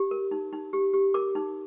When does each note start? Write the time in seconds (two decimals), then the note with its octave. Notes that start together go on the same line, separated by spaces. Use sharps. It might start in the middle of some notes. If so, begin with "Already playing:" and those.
Already playing: G4
0.11 A#4
0.31 D#4
0.53 D#4
0.73 G4
0.94 G4
1.14 A#4 D6
1.35 D#4